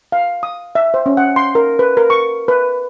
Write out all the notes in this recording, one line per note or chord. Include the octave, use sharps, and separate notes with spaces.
F5
D#6
E5
C5
C#4
F#5
C6
A#4
B4
A#4
C#6
B4